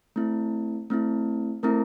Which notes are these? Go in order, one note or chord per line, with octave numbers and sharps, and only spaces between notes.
A3 C4 E4
A3 C4 E4
A3 C4 E4 A#4 A#5